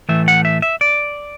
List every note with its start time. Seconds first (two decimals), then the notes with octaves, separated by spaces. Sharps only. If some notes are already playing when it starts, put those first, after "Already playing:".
0.09 A2 E3 A3 E5
0.28 F#5
0.45 E5
0.62 E5
0.81 D5